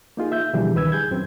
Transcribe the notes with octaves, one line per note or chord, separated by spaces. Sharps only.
A#3 D#4 F4 G#4
E5 G6
B2 D3 E3 F3 G3 G#4
C#2 D#3 B4 E6 G#6
G#4 G6 G#6
F#2 C4